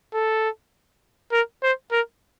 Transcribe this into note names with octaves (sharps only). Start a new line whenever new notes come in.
A4
A#4
C5
A#4